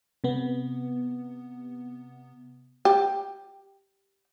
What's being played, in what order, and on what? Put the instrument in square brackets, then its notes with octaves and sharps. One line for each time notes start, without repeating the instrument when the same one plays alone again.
[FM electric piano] C3 B3
[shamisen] G4